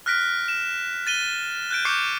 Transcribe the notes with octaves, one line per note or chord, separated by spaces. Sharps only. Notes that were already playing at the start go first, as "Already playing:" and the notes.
F6 F#6 A#6 B6 D7
E7
A6 D#7 G7
F#6 G6 D7
C#6 D6 G6 C7 C#7